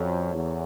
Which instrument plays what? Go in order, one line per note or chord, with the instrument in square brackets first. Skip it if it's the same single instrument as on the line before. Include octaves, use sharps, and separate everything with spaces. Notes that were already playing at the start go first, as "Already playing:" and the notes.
Already playing: [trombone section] F2 [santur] F#3 A3 C#4
[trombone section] E2